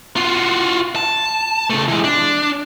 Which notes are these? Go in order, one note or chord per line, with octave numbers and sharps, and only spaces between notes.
F4 F#4
A5
C#3 A3
E3 G#3
D4